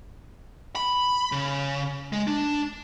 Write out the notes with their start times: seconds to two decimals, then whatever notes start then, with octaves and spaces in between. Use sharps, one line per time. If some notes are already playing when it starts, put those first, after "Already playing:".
0.75 B5
1.32 C#3
2.12 G#3
2.27 D4